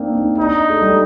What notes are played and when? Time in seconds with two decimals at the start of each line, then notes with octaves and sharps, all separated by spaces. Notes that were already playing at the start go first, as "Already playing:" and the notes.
Already playing: A#3 C4 D4 D#4
0.15 D#4
0.38 D4 D#4
0.70 A3
0.82 G3